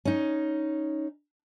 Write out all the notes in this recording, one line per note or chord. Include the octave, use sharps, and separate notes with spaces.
C#4 D#4